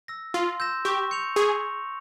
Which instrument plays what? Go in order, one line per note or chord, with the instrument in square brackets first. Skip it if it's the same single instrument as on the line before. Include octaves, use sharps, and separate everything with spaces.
[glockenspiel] E6 A#6
[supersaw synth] F4 [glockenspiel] C6
[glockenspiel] E6 G6 A#6 E7
[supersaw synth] G4 [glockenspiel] C#6
[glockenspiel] G6 C#7 F7
[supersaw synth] G#4 [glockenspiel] C#6